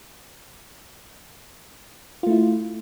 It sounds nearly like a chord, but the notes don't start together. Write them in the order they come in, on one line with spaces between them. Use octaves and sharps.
F4 A3 E4